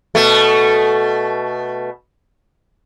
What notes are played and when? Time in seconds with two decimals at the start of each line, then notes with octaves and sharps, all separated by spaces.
0.15 B2 A3